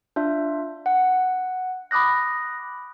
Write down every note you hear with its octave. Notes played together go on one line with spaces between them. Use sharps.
D4 F4 E5
F#5
B5 D6 D#6 F#6 A#6